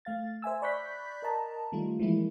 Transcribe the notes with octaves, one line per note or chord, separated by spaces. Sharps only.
A3 F5 A6
C5 E5 G#5 E6
D5 B5 C#6 F#6 G6 B6
A#4 D#5 A5 A#5
D#3 G3 A3 F4
E3 F3 G3 G#3 A#3 E4